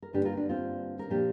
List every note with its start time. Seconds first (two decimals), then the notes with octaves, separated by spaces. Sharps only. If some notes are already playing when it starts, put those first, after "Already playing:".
0.02 A#4
0.13 G2 D3 A#3 D4 G4
0.25 F4 A#4
0.37 D4
0.49 C4 F4
0.99 A#4
1.10 A#2 F3 A#3 D4 G4